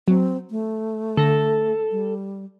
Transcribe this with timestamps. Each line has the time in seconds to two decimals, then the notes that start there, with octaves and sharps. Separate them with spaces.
0.08 F#3 C4
0.51 A3
1.17 D3 A4 A#6
1.91 G3